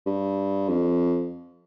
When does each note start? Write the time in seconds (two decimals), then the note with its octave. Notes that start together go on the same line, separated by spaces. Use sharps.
0.06 G2
0.69 F2